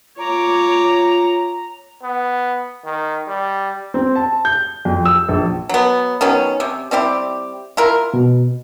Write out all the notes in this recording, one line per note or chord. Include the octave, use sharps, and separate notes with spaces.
F4 C#5 A#5 D6
B3
D#3
G3
C4
A5
G6
F2
E6
A#1
F#3 B3
D#3 F#3 B3 C#4
C3
G3 C4 E4 G4
E4 F4 A#4
B2